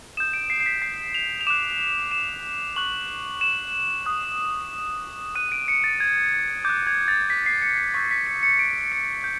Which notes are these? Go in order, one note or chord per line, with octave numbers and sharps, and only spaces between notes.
D#6 G6 E7
D7
C7
C7
B6
C7
F7
F7
D6 F#6 E7
E7
C#6 F#6 F#7
E7
D#6 F#6
D#6 F#6 D#7
D7
C#7
A6
G#6
D6 F#6 G6
G#6
A6
B6
C7
C#7
C7
C#6 E6 G6 B6
B6
C#7
C#7
D7
C#7
G6